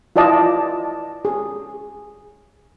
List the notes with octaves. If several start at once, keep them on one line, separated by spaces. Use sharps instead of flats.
E4 F4 D5 D#5 A5
G#4